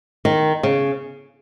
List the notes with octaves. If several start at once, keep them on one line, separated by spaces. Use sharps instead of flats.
D#3
C#3